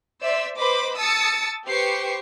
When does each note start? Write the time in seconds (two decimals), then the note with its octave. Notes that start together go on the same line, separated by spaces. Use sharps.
0.22 C5 D5 E5 E6
0.57 B4 C5 D#5 B5 D6
0.97 A5 D#6 E6 A6 C#7
1.67 G4 B4 C5 C#6 C7